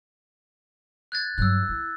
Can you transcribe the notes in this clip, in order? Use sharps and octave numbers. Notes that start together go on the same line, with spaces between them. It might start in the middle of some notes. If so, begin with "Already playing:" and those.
F#6 G#6 A6
G2 F#3 E6 F#6
E4